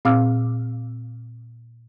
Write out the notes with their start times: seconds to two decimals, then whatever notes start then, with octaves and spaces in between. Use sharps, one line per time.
0.05 A#2 C4 F5 D6 E6 F6